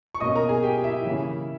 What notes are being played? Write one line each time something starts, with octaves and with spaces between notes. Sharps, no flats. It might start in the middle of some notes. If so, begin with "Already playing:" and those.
C#6
B2 A#3 C#4 D#5 D#6
A#4 A#5
G#4 G#5
G4 G5
E4 E5
C#3 E3 A#3 C#4